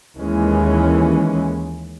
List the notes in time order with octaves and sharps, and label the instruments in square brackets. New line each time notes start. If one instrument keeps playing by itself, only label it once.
[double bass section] D#2 E3 G#3 C#4